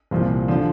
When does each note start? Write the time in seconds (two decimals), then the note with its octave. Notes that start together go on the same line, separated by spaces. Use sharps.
0.11 C2 A#2 F3
0.48 D3 F3